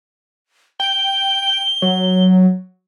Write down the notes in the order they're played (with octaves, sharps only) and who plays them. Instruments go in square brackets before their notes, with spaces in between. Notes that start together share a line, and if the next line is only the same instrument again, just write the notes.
[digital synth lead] G5 [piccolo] G7
[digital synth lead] F#3